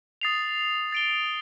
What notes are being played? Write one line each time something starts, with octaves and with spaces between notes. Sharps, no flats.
D#6 A6 C7 F7
A6 D7 G7